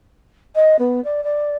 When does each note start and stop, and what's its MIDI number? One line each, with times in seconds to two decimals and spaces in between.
0.55 0.76 75
0.79 1.03 59
1.04 1.23 74
1.24 1.56 74